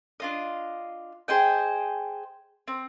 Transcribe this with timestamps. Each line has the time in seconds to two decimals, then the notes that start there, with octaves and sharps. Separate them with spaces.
0.20 D4 F4 D#5
1.28 G#4 C5 D#5 G5
2.68 C4